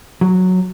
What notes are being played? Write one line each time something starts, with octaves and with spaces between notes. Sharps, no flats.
F#3